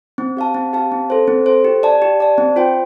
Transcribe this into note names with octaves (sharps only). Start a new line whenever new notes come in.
C4
G4 F5 A5
C4
G4 F5 A5
C4
A4 C5
C4
A4 C5
G4
D5 A5
G4
D5 A5
C4
F4 C5 G5